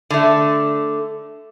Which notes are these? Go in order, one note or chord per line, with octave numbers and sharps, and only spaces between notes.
D3 A3